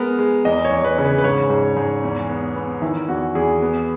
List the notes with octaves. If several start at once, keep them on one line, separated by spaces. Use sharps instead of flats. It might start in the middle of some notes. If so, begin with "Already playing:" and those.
Already playing: G#3 B3 A#4
G#3
E2 D#5
C#5
E2
B4
C#3
B4
B4
G#2 C#5
G#2
G#2
E2
B3
B3
D#3 E4
E2 F#4
E2 G#4
B3